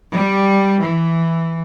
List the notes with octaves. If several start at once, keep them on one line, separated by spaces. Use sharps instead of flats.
G3
E3